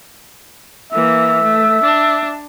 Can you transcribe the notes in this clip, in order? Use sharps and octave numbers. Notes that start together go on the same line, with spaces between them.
E3 A#3 E5
A3
D4